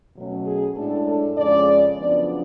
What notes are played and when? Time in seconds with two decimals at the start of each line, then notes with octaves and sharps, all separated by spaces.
0.16 B2 F#3 A3 C#4
0.46 G#4
0.76 A2 G#3 D4 A4
1.07 A4
1.36 F2 C#3 G#3 C#4 D5
1.97 F#2 C#3 F3 B3 D4 D5